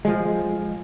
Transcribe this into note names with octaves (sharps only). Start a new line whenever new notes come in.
F3 G#3